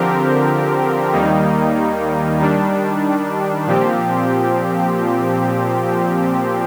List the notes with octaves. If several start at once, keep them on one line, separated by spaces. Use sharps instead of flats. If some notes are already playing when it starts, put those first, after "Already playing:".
Already playing: D3 F3 C4 G4 A#4
D#2 D#3 G3 A#3 D#4
D#3 G3 D4
A#2 F3 C4 G4